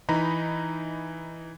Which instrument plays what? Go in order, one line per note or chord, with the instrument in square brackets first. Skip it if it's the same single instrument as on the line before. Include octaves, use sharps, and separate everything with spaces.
[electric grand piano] E3 D#4 A#5 B5